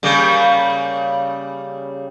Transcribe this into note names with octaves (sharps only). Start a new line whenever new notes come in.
C#3 G3 A#3